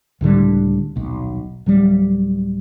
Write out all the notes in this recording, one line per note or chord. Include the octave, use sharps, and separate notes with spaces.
C#2 A2 D3 G3
D#1 B1
D1 F#3 G3